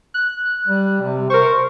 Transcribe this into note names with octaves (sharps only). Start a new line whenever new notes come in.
F#6
G3
C3
A#4 C5 C#6